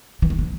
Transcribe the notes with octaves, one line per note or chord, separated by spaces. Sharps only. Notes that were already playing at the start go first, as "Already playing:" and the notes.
E3
D#3
D3